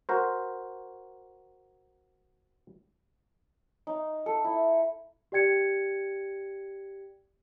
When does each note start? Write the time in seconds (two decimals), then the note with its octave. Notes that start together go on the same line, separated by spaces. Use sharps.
0.09 F#4 A#4 C5
3.87 D#4
4.26 A4
4.44 E4
5.32 G4 D5 G5 G#6 C#7